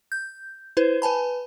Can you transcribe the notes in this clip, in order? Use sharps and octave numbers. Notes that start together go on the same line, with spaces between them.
G6
E4 B4 C5
B4 G#5 A5 B5